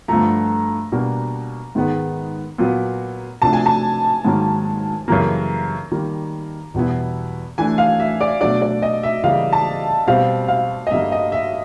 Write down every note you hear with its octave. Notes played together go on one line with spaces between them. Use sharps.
G2 D3 F3 A3 A#5
B2 G3 A#3 D4
G#2 D#3 G#3 B3
A#2 F#3 B3
C3 F3 A3 D4 F#4 A5
G#5
A5
G#2 D#3 F#3 A#3 C#4
F#2 C#3 E3 G3 A#3 A#5
D#3 G3 A#3
E2 B2 G3 B3 E4
E3 A3 D4 G#5
F5
E5
D5
B2 F#3 A3 D4 D5
D5
D#5
E5
C#3 E3 G3 A#3 F5
A5
B2 G3 C4 F5
F5
D#5
G2 D3 G3 A#3 E5
D#5
E5